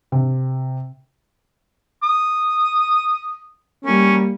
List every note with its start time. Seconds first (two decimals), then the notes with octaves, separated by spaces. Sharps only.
0.12 C3
2.03 D#6
3.85 G3 A#3 C#4